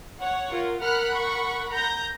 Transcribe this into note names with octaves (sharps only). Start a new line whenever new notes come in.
C#5 F#5
F4 A#4
A#4 F#5 B5 F6 F#6
C#6
A#5 G6 A#6